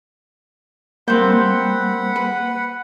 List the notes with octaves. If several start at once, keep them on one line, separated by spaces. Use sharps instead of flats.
G3 A#3 C4 F#5 G5 B5
B4